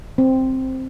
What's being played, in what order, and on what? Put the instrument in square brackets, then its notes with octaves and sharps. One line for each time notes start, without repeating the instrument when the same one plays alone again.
[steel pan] C4